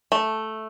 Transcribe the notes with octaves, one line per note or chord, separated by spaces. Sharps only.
A3